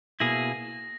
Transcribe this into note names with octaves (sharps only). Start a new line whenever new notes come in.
B2 A#3 E4 G#4 A#6